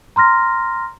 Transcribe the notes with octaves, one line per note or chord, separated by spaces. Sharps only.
A#5 C6 F6 A#6